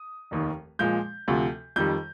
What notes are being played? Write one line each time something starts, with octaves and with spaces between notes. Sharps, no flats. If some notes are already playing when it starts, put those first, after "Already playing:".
Already playing: D#6
F1 D#2 D#3
A#2 F3 G#3 G6
D2 C3 F3
F2 D#3 G3 G6